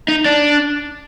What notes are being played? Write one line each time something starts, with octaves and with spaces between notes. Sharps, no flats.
D#4
D4